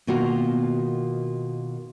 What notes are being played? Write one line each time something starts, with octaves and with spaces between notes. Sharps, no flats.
B2 D#3 A#3 F4 F#4 F#5